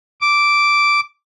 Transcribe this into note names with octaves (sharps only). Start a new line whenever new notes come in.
D6